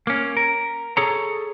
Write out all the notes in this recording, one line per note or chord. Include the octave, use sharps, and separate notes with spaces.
A#3 C#4
A#4
G#4 A4 C#5 A#5